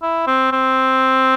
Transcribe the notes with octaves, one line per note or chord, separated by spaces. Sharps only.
E4
C4
C4